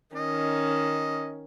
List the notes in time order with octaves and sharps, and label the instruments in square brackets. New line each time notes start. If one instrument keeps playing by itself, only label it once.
[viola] D#3 C#4 [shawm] D#5